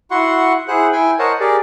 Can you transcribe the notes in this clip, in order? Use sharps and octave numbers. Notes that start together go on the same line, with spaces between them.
E4 F#4 F#5 C6 C#6
E4 G#4 C5 F#5 F#6
E4 G5 G#5
A#4 C5 C#5 D#5 F#5 A5
G4 G#4 A#4 D5